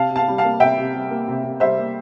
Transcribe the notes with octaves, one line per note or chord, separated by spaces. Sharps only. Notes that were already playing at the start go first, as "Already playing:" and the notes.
Already playing: C3 F5 A5
C3
F5 A5
G3
F5 A5
A#3
C3 E5 G5
C3
G3
A#3
C3
C3
G3 C5 E5
A#3